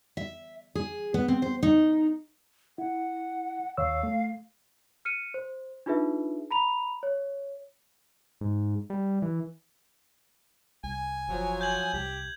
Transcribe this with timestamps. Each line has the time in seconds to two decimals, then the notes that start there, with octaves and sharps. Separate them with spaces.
0.17 E5
0.75 G#4
1.14 B3
1.28 C4
1.42 C5
1.63 D#4
2.78 E4 F#5
3.77 D#2 C#5 F5 E6
4.03 A3
5.05 F6 C#7 D#7
5.34 C5
5.86 D4 D#4 F4 G#4 B4 E5
6.51 A#5 B5 F7
7.03 C#5
8.41 G#2
8.90 G3
9.22 E3
10.84 C2 G#5
11.29 F#1 F3 F#3
11.61 G6 G#6 F#7
11.94 C2 G4